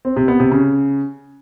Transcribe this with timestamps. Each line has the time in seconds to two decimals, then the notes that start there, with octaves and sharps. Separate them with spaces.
0.05 C4
0.16 C3
0.28 B3
0.40 C3
0.51 C#3